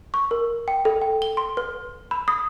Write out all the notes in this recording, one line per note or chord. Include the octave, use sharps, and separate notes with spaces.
C#6
A#4
G5
A4
G5
G7
C6
B4
B5
D#6